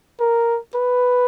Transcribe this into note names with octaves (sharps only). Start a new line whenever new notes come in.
A#4
B4